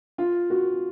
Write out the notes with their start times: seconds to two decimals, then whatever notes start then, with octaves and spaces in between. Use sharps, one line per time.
0.18 F4
0.50 F#4